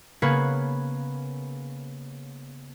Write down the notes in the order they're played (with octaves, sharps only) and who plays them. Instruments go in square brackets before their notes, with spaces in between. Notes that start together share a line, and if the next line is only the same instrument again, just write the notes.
[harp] C#3 A#3 B3 B4 C#5